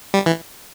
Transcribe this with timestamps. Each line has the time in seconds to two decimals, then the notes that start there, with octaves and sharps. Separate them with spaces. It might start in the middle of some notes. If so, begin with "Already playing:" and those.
0.14 G3
0.26 E3